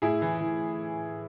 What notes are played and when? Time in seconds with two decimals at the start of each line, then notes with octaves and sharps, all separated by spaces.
0.02 A2 E4 G#4
0.22 E3
0.41 E3